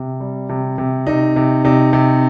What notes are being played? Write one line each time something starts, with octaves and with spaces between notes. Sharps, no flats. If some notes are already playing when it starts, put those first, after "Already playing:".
Already playing: C3
G3
C3
C3
C3 D#4
C3
C3 D#4
C3